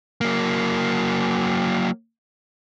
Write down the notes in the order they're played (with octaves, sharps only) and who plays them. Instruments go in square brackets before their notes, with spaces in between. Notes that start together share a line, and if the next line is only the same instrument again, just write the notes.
[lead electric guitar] F#3 A#3